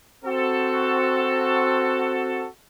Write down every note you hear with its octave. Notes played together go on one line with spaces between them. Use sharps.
C4 F#4 A4